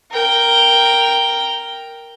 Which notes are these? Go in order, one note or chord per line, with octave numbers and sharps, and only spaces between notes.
A#4 G5